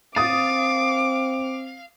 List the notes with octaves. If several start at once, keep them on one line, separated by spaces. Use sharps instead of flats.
C4 F5 D6 D#6 A6